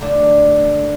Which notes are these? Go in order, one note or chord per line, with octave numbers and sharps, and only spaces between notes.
D3 A3 D4